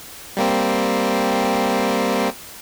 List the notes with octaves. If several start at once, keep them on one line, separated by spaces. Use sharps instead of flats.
G3 A#3 C4